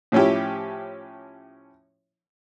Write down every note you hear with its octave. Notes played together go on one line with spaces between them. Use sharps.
A2 F3 C#4 E4 G4